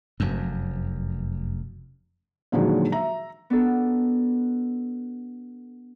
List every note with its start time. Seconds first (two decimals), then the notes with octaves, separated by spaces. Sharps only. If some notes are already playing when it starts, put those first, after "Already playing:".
0.20 F1 F#2
2.52 A#2 D3 D#3 F3 F#3 G#3
2.92 E5 A#5
3.50 B3 D4 F#4 A4